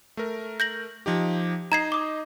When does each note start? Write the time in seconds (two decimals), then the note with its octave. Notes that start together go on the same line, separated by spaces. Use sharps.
0.17 A3 A#4
0.60 G6 A#6 F#7
1.06 F3 D#4 G4
1.72 D#4 D#5 A#5 G#6 C7
1.92 D6 D#6